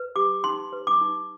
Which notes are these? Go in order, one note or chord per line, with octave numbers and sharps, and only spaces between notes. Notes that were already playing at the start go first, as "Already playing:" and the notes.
Already playing: B4
G4 D6
D#4 C6
B4
D6
D#4